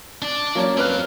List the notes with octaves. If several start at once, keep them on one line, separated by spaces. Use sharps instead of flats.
D4 D5
F#3 A#3 C#4
C4 B4 F5 F6 F#6